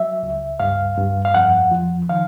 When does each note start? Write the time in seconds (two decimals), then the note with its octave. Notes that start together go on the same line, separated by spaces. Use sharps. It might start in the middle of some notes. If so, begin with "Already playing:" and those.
Already playing: F#3 E5
0.23 C#2
0.60 G2 F5
0.98 G2
1.25 F5
1.34 F2 F#5
1.71 F3
2.09 D#3 F5